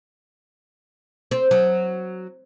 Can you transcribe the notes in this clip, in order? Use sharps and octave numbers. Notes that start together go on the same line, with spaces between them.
C4
F#3